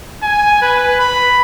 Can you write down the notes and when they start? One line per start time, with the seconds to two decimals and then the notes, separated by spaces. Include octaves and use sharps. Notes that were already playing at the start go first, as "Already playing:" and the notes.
0.23 G#5
0.62 B4
1.00 B5